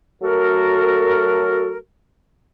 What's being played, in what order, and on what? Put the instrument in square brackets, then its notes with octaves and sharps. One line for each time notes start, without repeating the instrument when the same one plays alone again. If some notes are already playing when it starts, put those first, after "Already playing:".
[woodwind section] F#3 A3 F#4 A4 A#4